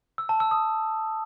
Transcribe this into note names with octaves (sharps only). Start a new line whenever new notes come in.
E6
A5
E6
D#6